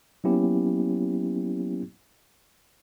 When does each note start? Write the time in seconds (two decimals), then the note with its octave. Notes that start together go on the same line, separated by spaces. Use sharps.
0.24 F#3 A#3 B3 C#4 E4 G4